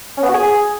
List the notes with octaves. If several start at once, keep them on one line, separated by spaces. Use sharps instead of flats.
C#4
B3
F#4
G#4